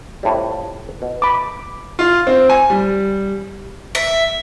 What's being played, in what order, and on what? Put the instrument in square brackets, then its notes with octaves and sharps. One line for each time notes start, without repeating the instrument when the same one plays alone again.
[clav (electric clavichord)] F2 A2 G3
B2
[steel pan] B5 D6
[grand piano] F4
C4
G#5
G3
[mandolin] E5